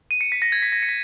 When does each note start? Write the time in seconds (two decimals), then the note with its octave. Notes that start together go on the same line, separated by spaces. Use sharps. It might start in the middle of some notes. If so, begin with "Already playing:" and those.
0.11 D#7
0.21 C#7
0.32 B6
0.42 A#6
0.52 G#6
0.62 B6
0.72 A#6
0.83 C#7
0.89 B6